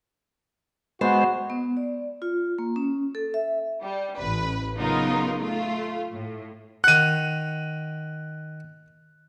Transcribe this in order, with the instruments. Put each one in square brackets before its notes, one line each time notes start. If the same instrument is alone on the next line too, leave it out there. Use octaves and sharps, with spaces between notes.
[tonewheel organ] G#3 C5 [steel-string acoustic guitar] B3 [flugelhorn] F#4
[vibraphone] B3
D5
F4
A#3
C#4
A4
E5
[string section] G3
A1 B4
C#3 F#3 B3 D#4 F4 A#4
A3 F4
A2
[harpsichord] D#3 F#5 [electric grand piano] F#6 D#7